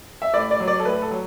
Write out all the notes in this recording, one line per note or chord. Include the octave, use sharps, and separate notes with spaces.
E5
A2 D5
D5
F#3
D5
A4
A2 B4
A4
F#3